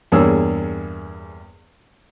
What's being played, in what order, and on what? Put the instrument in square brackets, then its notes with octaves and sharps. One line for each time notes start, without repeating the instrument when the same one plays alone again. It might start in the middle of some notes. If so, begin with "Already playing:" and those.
[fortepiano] E2 G2 A#3 G#4 C#5 E6